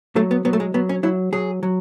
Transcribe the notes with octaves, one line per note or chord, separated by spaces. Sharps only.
F#3 A3
B3
F#3 B3
A3
G#3
F#3 B3
C#4
F#3 E4
F#3 G#4
F#3